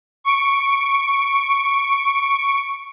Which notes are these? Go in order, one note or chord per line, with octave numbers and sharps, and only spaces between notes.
C#6 D7